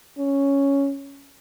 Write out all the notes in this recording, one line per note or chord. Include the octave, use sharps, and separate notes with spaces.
C#4